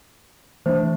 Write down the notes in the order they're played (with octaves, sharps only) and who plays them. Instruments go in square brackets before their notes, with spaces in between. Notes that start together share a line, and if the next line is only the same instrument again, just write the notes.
[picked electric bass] E3 A3 D4 [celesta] C5